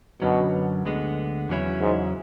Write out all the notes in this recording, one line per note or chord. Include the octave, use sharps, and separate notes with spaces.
F#2 B2 D3 F#3 C#4
D2 D3 G#3 B3
E2 C#3 F#3 C#4 E4
G#2